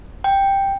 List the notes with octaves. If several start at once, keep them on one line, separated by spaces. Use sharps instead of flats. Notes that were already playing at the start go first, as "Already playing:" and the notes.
G5